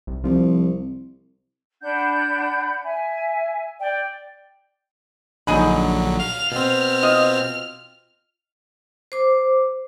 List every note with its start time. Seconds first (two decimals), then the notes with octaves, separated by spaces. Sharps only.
0.07 C2
0.24 C2 F3
1.82 D4 F#5 B5 G6
2.83 E5 G#5
3.79 D5 G5
5.47 A#1 D3 F#3 D#4 G#4 B5
6.20 F5 F7
6.52 B2 C4 F6
7.03 F4 D#5
9.12 C5 D6